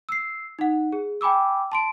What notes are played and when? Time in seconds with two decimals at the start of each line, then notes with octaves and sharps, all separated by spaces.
0.09 E6 C7
0.59 D#4 F#5
0.92 G#4
1.21 G5 G#5 B5 D6 E6
1.72 A5 C6 D7